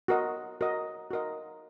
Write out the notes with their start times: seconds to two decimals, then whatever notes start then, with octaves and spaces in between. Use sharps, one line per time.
0.08 F#4 A#4 D#5
0.61 F#4 A#4 D#5
1.10 F#4 A#4 D#5